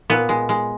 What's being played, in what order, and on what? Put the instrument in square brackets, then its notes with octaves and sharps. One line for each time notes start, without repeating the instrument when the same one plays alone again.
[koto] A#2 B3
G#3
G#3